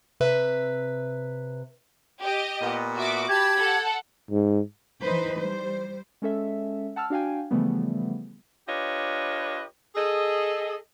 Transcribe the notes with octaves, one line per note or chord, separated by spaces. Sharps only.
C3 B4 E5
G4 D#5
A#2 B3
F#4 E5 D6
G4 A5 B5 G#6
A4 F#5
G#2
E3 D#4 B4 C5
G3 C5
G#3 C#4 A4 E5
F#5 A5 E6 F6
D4 F#4 F5 G5 G#5
C#3 E3 F3 G3 A3 B3
D4 F4 G4 B4 C#5 D#5
G#4 A4 D#5